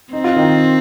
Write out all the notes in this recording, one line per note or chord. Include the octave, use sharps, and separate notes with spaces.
C4 D#4
F4
D#3 D#4